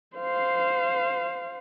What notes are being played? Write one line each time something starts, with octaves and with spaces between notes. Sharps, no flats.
C5 F5